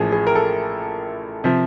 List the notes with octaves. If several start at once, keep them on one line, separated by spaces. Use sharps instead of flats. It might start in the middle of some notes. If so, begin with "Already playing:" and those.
Already playing: A1 A2 F3 A#3 G#4
G#4
A#4
A4
C3 F3